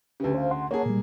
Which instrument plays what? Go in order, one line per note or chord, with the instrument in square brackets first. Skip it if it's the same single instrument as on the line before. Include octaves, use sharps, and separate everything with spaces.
[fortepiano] D2 C#3 [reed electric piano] G4 B4
[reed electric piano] C5 F5
F#5 C6
[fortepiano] A#3 G#4 [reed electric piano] C#5 F#5 A5
[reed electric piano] A#2 G3